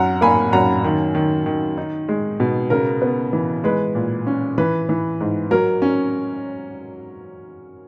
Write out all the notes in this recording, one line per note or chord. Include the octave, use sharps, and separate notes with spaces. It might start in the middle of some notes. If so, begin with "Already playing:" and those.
Already playing: F#2 F#5 A#5
A#3 G#5 B5
F#2 F#5 A#5
D#3
D#3
D#3
D#4
G#3
B2
C#3 A#4
B3
E3
G#3 B4
A#2
C#4
E3 B4
E3
G#2
F#3 A#4
C#4